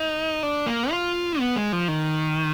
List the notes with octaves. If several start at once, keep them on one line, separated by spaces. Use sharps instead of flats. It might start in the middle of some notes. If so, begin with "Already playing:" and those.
Already playing: D#4
D4
A#3
F4
B3
G#3
F3
D#3